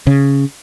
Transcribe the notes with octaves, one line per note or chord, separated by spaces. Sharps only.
C#3